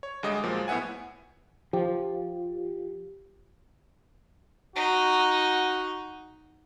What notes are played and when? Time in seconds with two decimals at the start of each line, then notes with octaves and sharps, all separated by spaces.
0.03 C#5
0.23 D2 G3 G#3 D#5 D6
0.43 A#2 F3 F#3 G#3
0.68 A2 B3 E5 F#5 G#5
1.73 F3 F4 G4
4.76 D#4 F#4